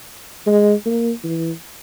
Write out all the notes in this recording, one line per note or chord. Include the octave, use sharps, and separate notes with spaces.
G#3
A#3
E3